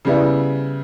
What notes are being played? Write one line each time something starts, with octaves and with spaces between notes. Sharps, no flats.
C#3 G3 B3 E4